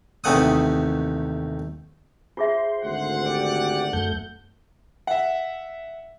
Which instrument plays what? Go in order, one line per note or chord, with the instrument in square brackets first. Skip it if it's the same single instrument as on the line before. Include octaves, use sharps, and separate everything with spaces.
[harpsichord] A1 D#2 C3 A3 F#5 D#6
[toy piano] F4 G#4 E5 [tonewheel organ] C5
[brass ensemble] G#1 D2 F#5
[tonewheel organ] G4 D5
F#2 A3 G6
[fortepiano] E5 F#5